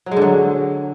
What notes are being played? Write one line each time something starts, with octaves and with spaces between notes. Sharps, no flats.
F#3
G#3
D3
F#3